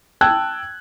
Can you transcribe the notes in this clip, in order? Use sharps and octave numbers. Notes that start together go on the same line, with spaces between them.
G5 A5 E6 F#6 G#6